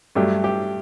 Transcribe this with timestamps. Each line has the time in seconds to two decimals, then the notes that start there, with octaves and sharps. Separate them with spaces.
0.15 G2 F#3 A3 G4
0.44 G4